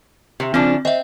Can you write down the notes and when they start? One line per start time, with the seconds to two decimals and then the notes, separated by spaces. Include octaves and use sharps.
0.40 C3
0.54 C#3 F3 C4 D4
0.85 C4 D#5 E5